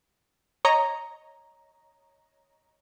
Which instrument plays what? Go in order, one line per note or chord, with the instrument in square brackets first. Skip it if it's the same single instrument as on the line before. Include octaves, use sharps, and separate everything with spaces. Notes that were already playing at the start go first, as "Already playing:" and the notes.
[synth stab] C#5 D#5 A#5